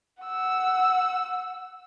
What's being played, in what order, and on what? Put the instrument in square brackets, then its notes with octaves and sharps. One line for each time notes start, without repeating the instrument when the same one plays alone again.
[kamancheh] F#5 E6